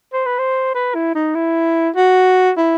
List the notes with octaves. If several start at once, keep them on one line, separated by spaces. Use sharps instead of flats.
C5
B4
C5
B4
E4
D#4
E4
F#4
E4